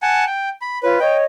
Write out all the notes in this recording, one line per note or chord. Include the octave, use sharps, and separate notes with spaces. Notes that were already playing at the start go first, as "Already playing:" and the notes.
F#5 G#5 A5
G5
B5
F4 B4 C#5
C#5 D#5 G5